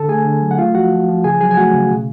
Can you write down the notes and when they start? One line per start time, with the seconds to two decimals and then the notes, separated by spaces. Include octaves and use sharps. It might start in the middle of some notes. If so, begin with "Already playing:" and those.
Already playing: D3 A4 A5
0.09 A3 G#4 G#5
0.25 D3
0.42 F#3
0.51 F#5
0.58 A3 F4 F5
0.75 F3 F#4 F#5
0.91 F3
1.08 F3
1.24 C#3 G#4 G#5
1.41 F#3 G#4 G#5
1.51 G#5
1.57 A3 F#4 F#5
1.74 C#3
1.90 B2